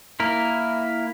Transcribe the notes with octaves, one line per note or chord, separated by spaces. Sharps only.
A#3 E4 A#4